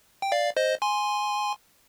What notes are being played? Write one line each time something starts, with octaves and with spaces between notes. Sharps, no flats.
G5
D5 F5
C5 D#5
G#5 C6